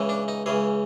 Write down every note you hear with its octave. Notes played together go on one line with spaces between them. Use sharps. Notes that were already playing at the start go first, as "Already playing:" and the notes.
Already playing: C#2 C#3 E3
D4
D#4
C#2 C#3 E3 G#4